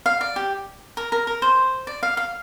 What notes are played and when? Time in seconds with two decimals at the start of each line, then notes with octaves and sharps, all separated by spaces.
0.06 F5
0.21 D5
0.36 G4
0.97 A#4
1.12 A#4
1.27 A#4
1.42 C5
1.87 D5
2.03 F5
2.17 F5